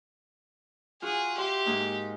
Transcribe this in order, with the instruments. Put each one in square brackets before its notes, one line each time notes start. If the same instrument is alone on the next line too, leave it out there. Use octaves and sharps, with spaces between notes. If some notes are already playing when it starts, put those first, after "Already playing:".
[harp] F4 F#4 [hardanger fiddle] G#4
[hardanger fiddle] G4 [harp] E5 C6
[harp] G#2 A#3 D#4